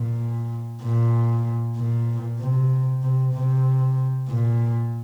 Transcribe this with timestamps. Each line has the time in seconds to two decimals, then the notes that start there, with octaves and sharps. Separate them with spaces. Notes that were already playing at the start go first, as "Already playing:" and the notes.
Already playing: A#2
0.83 A#2
1.77 A#2
2.39 C3
3.03 C3
3.34 C3
4.29 A#2